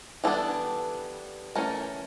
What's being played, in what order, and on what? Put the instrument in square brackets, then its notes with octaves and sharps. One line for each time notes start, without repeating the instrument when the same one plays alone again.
[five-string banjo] E3 G3 B3 D4 A4
E3 A3 C#4 A#4